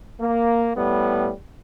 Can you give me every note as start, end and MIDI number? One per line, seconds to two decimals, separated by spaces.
0.21 0.71 58
0.77 1.31 45
0.77 1.31 55
0.77 1.31 59